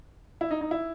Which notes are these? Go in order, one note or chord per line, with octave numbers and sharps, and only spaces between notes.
E4
D#4
D#4
E4